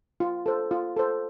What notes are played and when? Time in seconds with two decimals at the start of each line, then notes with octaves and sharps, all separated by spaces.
0.20 F4
0.46 A4 C5
0.71 F4
0.97 A4 C5